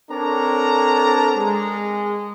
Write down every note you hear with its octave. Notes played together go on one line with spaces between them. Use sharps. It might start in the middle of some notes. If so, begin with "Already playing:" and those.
C4 D4 A4 A#4 C#5 A#5
G#3